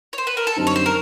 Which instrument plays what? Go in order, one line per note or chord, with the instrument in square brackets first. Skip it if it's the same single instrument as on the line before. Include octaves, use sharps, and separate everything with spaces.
[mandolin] C#5
C5
B4
A#4
A4
[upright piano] F#2 D3 G3 C4 D#4
[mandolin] C#5
C5
A#4